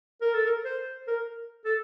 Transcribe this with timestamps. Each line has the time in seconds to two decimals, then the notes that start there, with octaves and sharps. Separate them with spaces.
0.22 A#4
0.34 A4
0.46 A#4
0.65 C5
1.07 A#4
1.65 A4